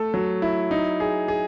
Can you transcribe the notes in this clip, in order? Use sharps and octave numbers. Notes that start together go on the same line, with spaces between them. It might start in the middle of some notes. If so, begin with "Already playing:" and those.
Already playing: A3 A4
F#3
E4
D#4
G#4
G#4